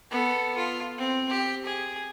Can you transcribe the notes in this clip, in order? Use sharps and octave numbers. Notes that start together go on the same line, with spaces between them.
B3 A4
F4
C4
G4
G#4